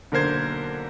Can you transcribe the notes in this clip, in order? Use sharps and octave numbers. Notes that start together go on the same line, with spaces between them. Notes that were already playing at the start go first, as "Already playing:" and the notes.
B1 D3 A#3 A#4 C5 G#6